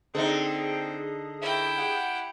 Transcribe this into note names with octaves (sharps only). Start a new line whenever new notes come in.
D3 C4 D#4 G#4
G#2 D#3 E4 E5 G5
G4 F#5